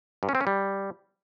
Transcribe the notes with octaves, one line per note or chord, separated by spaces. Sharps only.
G2
C#4
C4
C#4
G3